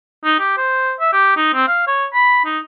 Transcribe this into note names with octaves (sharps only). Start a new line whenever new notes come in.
D#4
G4
C5
E5
G4
D#4
C4
F5
C#5
B5
D#4